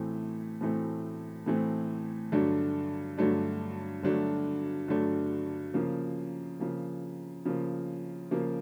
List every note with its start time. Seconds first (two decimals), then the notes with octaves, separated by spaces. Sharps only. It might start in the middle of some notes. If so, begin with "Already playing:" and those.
Already playing: A2 E3 A3 C4
0.61 A2 E3 A3 C4
1.46 A2 E3 A3 C4
2.32 G2 D3 F#3 A3 D4
3.18 G2 D3 F#3 A3 D4
4.03 G2 D3 F#3 A3 D4
4.88 G2 D3 F#3 A3 D4
5.74 C#3 F3 A#3
6.60 C#3 F3 A#3
7.45 C#3 F3 A#3
8.31 C#3 F3 A#3